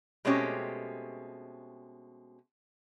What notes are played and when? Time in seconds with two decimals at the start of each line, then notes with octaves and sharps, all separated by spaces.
0.25 B2 G#3 A3 C4 C#4 G4